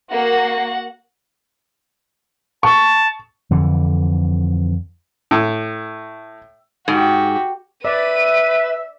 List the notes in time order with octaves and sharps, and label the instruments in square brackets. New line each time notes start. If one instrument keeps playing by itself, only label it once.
[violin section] A#3 [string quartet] F#4 F#5
[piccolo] A5 [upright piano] C#6
[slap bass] F2 D3 E3
[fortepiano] A2
[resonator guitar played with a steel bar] G#2 [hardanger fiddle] F#4 G4
[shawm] B4 [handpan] D5 [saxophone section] E5 [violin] D#7